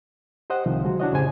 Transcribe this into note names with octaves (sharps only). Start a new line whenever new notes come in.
G4 C5 D#5 F#5
C2 C3 D#3 F3
D3 F#3 G#3 F#4
D4 E4 F#4 C#5 D#5
F2 A2 C#3 G4 C5 G#5